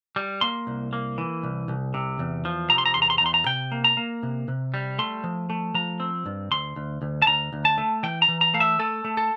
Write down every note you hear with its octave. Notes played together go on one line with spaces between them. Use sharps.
G3
A#3 C6
C2
A#3
E3
C2
C2
C3
E2
F3
C3 A#5
C6
A#5
E2 C6
A#5
C6
A#5
E2 C6
A#5
C3 G5
A#3
A#5
A#3
C3
C3
G3
A3 C6
F3
A3
F3 A#5
C4
G2
D2 C6
D2
D2
A5
D2 A#5
D2
A5
A3
E3 G5
A#5
E3
A#5
A3 F5
E5
A3 A4
A3
A4